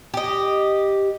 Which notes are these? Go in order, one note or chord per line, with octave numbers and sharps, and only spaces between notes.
G4 D#5